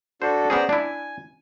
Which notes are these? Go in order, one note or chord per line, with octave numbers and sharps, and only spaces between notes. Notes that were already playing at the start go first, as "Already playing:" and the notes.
D4 F#4 A4 C5
B3 C#4 G#4 C5 D5 A#5
D4 E4 G#5